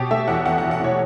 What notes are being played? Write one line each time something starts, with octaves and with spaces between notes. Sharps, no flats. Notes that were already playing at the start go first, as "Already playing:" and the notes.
Already playing: B2 G4
A3 E5
E2 F#5
E2 F#5
F#5
E2
F#5
B2 C#5